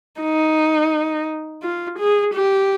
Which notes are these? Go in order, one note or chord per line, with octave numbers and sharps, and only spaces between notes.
D#4
F4
G#4
G4